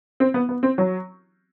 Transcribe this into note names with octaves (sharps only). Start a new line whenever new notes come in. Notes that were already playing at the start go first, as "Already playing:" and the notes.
C4
B3
B3
C4
F#3